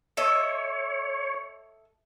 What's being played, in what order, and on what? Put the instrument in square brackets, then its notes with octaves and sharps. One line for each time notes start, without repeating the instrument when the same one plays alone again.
[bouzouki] A4 D#5 E5 [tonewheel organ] C#5